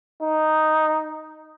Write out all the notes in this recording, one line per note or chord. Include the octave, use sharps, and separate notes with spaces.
D#4